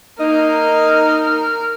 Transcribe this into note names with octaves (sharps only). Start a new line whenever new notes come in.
A#3 D#4 A#4 D#5